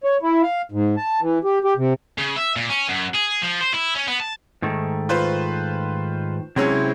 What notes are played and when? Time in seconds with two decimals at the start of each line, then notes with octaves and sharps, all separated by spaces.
0.04 C#5
0.22 E4
0.42 F5
0.72 G#2
0.97 A5
1.21 E3
1.44 G4
1.64 G4
1.77 C3
2.18 C#3
2.37 E5
2.56 A#2
2.69 C#4
2.88 F#2
3.14 G#4
3.42 F3
3.61 C5
3.74 E4
3.95 C#4
4.08 B3
4.20 A5
4.62 G#2 D#3 A3
5.09 F4 B4 C5
6.56 C3 F#3 G#3 C4 C#4 E4